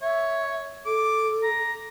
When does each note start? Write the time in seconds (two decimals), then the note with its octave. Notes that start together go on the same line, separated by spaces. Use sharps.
0.02 C#5 E5
0.86 A4 D6
1.43 A#5